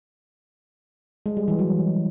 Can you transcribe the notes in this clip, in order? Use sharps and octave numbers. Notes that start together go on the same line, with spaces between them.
G#3
G3
E3
F#3